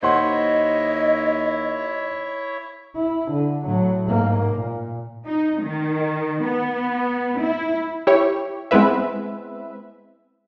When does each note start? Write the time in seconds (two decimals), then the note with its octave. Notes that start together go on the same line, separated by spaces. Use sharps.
0.03 D#2 E4 C5 C#5 D#5 E5 F#5 C6
2.96 E4
3.32 D3
3.65 A2 F#3
4.06 G#2 A#3
4.54 A#2
5.26 D#4
5.62 D#3
6.43 B3
7.39 E4
8.07 E4 G4 C#5
8.71 G#3 B3 C4 E4 B4 E5